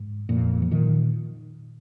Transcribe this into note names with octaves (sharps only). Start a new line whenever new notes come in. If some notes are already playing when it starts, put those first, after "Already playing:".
Already playing: G#2
F2 A#2
F3
A#2 D#3